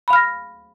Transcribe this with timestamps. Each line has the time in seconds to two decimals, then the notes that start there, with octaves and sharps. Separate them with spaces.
0.08 B5
0.10 F5
0.13 F6
0.16 A#6